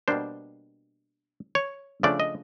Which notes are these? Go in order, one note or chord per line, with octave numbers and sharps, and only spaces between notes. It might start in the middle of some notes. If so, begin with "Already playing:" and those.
B2 G3 A#3 D4 C5
C#5
C#3 F3 A3 D4 D5
D#5